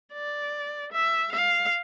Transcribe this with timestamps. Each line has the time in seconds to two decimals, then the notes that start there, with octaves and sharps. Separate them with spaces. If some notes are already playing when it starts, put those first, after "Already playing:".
0.13 D5
0.93 E5
1.33 F5